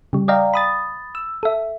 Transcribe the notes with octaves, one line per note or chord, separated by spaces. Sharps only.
C#3 G3
D5 D#5 F5 G5 A#5
B5 D#6 A6
E6
A4 E5